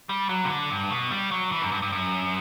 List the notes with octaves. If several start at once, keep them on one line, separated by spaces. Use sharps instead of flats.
G3
F#3
C3
D3
G2
B2
G3
F#3
E3
F#2
G2
G2
F#2